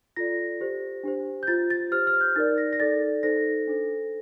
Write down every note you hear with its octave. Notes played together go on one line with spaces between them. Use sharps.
F4 A4 D5 A#6
G4 C5
D4 G4 C5
G6
F4 C5 A6
A6
G4 C5 F6
F6
G6
D#4 A#4 D5 A6
A#6
A#6
D#4 A4 D5 A6
D#4 A4 C5 A#6
D4 A4 C5